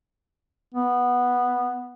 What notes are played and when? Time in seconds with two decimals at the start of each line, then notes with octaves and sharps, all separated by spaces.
0.74 B3